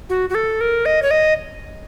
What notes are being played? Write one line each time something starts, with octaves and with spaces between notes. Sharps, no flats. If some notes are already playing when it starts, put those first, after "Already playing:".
F#4
F#4
A4
A#4
D#5
C#5
D#5